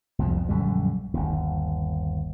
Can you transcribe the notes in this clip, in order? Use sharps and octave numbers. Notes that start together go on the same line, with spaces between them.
C2 F2 B2 F3
A#1 F#2 D3 G3
G1 D#2